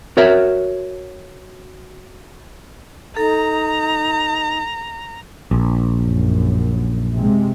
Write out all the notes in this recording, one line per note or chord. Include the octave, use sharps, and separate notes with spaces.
F#4 A#4 C#5 E5
D#4 A4 A#5
A#1
F#2
C3 G#3